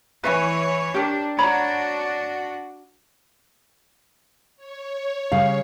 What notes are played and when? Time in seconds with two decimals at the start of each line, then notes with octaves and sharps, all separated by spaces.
0.24 E3 B4 C#5 E5 G#5
0.94 D4 G4 A#4
1.38 D4 F#4 C#5 A#5 B5
4.56 C#5
5.32 C#3 G3 F5